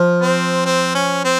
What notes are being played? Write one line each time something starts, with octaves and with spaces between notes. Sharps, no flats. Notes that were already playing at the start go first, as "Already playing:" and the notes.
Already playing: F3
C4
C4
C#4
C4